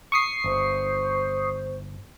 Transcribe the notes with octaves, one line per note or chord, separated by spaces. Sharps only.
C#6 D#6 C7
G1 C5